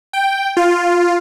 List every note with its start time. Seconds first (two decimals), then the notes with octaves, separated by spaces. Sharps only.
0.13 G5
0.57 F4